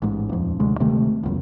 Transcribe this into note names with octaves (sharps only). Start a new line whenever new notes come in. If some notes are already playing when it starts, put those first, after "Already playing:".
A1 G#2
D#1 F2
D2 C3 G#3
D1 C3 D#3 A3
E1 C#2 F#2